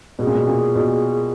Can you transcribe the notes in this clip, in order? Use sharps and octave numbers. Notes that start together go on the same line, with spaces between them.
B2 G#4
A#2
B2
A#2
B2